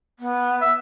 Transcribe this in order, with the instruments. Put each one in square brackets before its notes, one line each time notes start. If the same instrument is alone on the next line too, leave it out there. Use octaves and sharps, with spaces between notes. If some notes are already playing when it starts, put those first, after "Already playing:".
[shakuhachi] B3
[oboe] E5